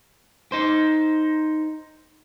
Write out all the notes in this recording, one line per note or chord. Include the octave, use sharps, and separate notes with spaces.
D#4 C5